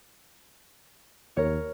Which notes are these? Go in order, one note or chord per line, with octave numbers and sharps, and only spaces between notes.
D#2 A#4 C#5